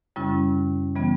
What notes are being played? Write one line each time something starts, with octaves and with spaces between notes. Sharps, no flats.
F#2 C#3 G3 C#4 E4
C#3 E3 G3 B3